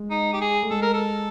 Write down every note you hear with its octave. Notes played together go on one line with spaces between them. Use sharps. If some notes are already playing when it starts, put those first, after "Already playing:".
Already playing: G#3
D#4
G4
G#4
A3
G#3 A4
A#4
A4